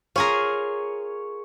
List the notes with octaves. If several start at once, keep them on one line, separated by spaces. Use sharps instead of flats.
F4 G#4 A#4 C#5